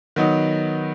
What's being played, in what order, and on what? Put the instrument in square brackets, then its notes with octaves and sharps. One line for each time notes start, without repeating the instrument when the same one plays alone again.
[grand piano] D#3 F#3 B3 D#4